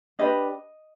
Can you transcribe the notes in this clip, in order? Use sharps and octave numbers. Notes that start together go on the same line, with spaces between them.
D4 G4 B4 D#5